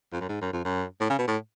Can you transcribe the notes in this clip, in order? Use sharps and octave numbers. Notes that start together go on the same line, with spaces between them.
F2
F#2
G#2
F#2
F2
F#2
A2
C#3
B2
A2